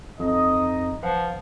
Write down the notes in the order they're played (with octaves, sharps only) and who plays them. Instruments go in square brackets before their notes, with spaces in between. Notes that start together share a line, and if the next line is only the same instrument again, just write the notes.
[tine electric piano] F2 [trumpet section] D#4 D#5
[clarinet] F3 [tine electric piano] B4 F5 F#5